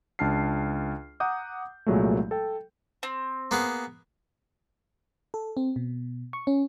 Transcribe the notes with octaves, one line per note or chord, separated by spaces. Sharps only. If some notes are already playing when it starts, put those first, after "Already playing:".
C#2 D4 A5 F6 C7
F#5 A#5 D6 D#6 G6
C2 A#2 F#3 G#3 A3
A4 G5
C4
A#3 B3 G#4
A4
C4
B2
C#6
C#4